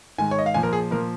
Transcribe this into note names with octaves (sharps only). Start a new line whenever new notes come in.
G#2 D#3 G#5
C#5
D#5
F5
A#2 F3 G#5
A#4
G#4
A#2 F3 A#4